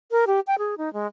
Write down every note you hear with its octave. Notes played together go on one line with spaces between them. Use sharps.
A#4
G4
G5
G#4
D#4
G#3